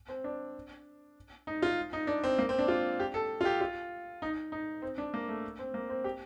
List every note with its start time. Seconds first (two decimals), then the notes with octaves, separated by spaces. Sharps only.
0.08 C4
0.24 D4
1.47 D#4
1.62 F4
1.93 D#4
2.07 D4
2.24 C4
2.38 A#3
2.49 C4
2.59 D4
2.68 F4
2.99 G4
3.14 A4
3.41 F4
3.45 G4
3.61 F4
4.22 D#4
4.52 D#4
4.82 C4
4.98 D4
5.14 A#3
5.28 A3
5.59 C4
5.74 A#3
5.89 C4
6.04 G4